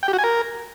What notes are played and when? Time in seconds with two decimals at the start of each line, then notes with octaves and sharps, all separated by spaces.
0.03 G5
0.08 G4
0.13 F#4
0.19 G#5
0.24 A#4